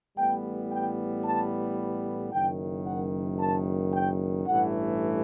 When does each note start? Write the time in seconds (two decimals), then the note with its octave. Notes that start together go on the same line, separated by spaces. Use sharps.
0.18 A1 A2 G3 B3 G5
0.71 G5
1.25 A5
2.32 F#1 F#2 D#3 G5
2.86 F#5
3.39 A5
3.93 G5
4.46 A1 G2 E3 A3 F#5